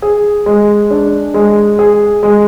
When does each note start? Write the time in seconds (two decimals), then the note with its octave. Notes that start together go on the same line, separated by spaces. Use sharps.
0.02 G#4
0.46 G#3
0.91 D4
1.34 G#3
1.79 G#4
2.23 G#3